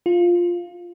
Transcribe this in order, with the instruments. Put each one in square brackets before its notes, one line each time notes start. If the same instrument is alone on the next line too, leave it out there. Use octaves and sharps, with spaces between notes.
[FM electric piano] F4